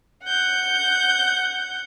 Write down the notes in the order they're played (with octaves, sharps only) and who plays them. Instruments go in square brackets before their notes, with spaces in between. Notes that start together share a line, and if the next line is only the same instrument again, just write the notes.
[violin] F#5 G6